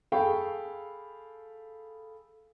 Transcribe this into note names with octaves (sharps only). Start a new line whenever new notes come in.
G#4 A4 F5 G5 B5 C#6